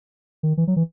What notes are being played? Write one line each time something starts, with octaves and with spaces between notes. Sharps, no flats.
D#3
E3
F#3
E3